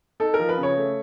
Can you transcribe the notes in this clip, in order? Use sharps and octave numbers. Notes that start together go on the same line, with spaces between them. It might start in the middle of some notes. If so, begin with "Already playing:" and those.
D#4 A4
A#4
F3
B4
C#3
C#5
A3